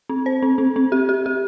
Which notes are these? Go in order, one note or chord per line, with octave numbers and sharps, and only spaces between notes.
C4
C5
C4
C4
C4
G4
G4
G4